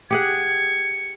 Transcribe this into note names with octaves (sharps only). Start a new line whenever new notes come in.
G4 G#4 F#5 G#6 C#7